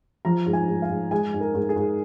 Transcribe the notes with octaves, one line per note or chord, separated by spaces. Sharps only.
F3 A#5
G#2
G#5
G#2
F5
G#2
G#3 G#5
G#2
A#4
G#2
G#4
G#2